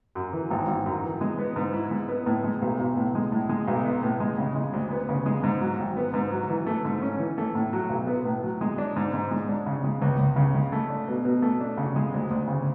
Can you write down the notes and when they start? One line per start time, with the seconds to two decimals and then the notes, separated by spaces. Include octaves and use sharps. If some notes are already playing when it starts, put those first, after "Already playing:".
0.15 F#2
0.33 E3
0.51 G#1
0.68 G#1
0.86 F#2
1.04 E3
1.21 G#3
1.39 B3
1.56 G#2
1.73 E4
1.91 G#3
2.09 B3
2.26 A2
2.44 G#3
2.62 B1
2.80 B1
2.97 A2
3.15 G#3
3.32 A2
3.49 G#3
3.68 B1
3.85 B3
4.03 A2
4.20 G#3
4.38 C#3
4.56 G#3
4.73 D2
4.91 B3
5.09 C#3
5.26 G#3
5.43 G#2
5.61 F#3
5.79 G#1
5.97 B3
6.14 G#2
6.32 F#3
6.50 E3
6.67 A3
6.85 G#2
7.02 C#4
7.19 E3
7.38 A3
7.55 A2
7.73 F#3
7.90 B1
8.07 B3
8.25 A2
8.44 F#3
8.61 G#3
8.78 D4
8.96 G#2
9.14 G#2
9.31 G#3
9.48 D4
9.66 C#3
9.84 G#3
10.02 C#2
10.19 C#2
10.36 C#3
10.55 G#3
10.72 A3
10.90 D4
11.08 B2
11.25 B2
11.42 A3
11.60 D4
11.78 C#3
11.96 G#3
12.14 D2
12.31 D2
12.48 C#3